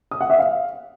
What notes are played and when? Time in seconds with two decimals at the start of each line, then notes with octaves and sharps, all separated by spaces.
0.11 D#6
0.21 F#5
0.30 E5
0.39 F5